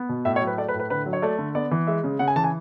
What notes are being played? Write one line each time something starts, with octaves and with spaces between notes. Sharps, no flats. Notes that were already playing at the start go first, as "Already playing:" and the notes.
Already playing: B3
B2
A2 E5
C#5
F#3
B4
A3 D5
B4
A2
B4
D3 B4
F#3
C#5
A3 D5
D3
B3 D5
E3
G#3 E5
C#3
C#3 F#5
G#5
E3 A5
G#5